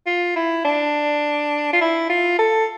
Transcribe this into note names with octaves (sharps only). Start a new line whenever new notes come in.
F4
E4
D4
F4
E4
F4
A4